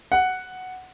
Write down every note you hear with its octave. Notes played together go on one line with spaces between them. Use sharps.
F#5